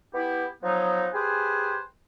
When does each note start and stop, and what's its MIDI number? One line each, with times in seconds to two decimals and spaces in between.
0.13 0.46 59
0.13 0.46 64
0.13 0.46 67
0.63 1.08 53
0.63 1.08 54
0.63 1.08 59
0.63 1.08 63
1.14 1.78 67
1.14 1.78 68
1.14 1.78 71
1.14 1.78 72
1.14 1.78 80